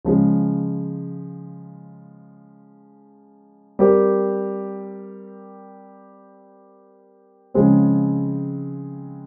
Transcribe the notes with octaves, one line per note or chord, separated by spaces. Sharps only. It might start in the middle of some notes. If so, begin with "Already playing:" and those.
C#3 F3 G#3
G3 C4 G4 A#4
C#3 F3 G#3 C4